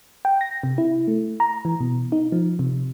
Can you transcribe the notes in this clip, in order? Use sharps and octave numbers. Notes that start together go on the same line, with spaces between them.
G5
A#6
C3
E4
A3
A#5
E3
B2
D#4
F3
C3